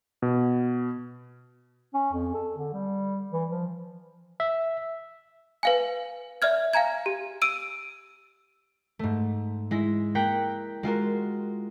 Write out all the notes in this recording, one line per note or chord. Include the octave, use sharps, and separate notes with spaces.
B2
C#4
F2
A4
D3
G3
E3
F3
E5
B4 F5 G#5
D5 E5 F6 G#6
F5 G#5 A#5 G#6
G4
E6 D7 D#7
G#2 A3
G#3 E4 A#6
A#3 G5 A#5 F#6 B6 C#7
G#3 F4 F#4 A#4